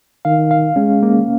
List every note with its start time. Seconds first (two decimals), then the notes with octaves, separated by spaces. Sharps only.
0.25 D#3 F5
0.51 F5
0.76 G#3 C#4
1.03 A#3